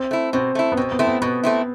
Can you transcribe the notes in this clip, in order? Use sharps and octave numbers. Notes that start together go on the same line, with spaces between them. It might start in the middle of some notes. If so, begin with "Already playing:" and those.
Already playing: C4
A3 E4
B2 C4
A3 E4
B3
B2 C4
B3
A3 C4 E4
B3
B2 B3
A3 C4 E4